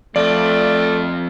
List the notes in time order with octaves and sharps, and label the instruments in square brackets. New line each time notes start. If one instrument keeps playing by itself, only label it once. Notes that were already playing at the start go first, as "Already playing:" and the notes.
[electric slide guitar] F2 F4 [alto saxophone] A3 [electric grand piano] D5